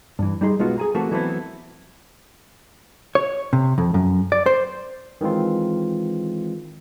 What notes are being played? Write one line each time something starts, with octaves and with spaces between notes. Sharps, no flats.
G2 E3
G3 D#4 G#4 C6
B1 G#3 B3 F4 F#4
G#4 G#5 A#5
E3 A3 A#3 C4 F#4
E3 F#3 A3 B3 C4 E4
C#5
C3
F2
F#2
D5
C5
D#3 E3 G#3 C4 F4